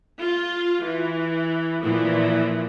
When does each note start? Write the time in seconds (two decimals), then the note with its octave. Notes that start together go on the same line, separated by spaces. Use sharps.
0.20 F4
0.85 E3
1.82 A#2 E3 F3